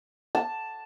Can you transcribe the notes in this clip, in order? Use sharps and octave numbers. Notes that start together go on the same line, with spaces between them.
A5